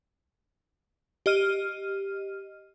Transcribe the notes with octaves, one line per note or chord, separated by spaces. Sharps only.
G4 D#5 F6 D#7